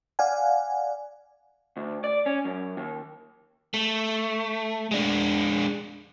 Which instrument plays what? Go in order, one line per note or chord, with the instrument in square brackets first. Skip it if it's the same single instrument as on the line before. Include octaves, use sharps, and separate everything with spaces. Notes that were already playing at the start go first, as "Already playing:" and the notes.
[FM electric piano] D5 F5 F#5 G#5
[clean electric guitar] D2
D5
C#4
F#2
D#2
[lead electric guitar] A3
G#3 D4